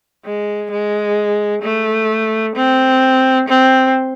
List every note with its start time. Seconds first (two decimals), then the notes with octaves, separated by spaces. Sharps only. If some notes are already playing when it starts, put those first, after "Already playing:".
0.25 G#3
0.72 G#3
1.63 A3
2.55 C4
3.48 C4